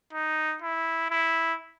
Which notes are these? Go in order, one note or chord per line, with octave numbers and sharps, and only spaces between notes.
D#4
E4
E4